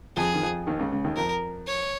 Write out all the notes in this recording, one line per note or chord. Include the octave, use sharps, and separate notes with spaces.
F2 F3 G#4
D#3
F2 F3
D#2 D#3
C#2 C#3
C#2 C#3
D#2 D#3
F2 F3 A#4
C#5